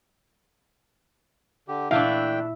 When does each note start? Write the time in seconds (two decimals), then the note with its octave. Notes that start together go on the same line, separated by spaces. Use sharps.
1.68 D3 G4
1.91 A#2 E3 A3 D4 E4 E5 F5 G5